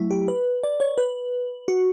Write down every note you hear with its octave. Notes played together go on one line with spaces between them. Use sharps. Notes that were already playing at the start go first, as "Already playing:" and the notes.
Already playing: F#3 A3 E4
G4
B4
D5
C#5
B4
F#4